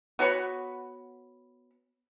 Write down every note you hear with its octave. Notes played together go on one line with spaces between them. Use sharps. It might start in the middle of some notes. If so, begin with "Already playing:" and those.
B3 F#4 C#5 B5